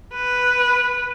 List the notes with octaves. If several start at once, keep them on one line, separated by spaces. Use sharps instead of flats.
B4